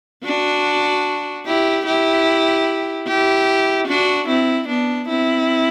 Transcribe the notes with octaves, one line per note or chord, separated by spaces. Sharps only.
D4 F#4
E4 G4
E4 G4
E4 G4
D4 F#4
C4 E4
B3 D4
C4 E4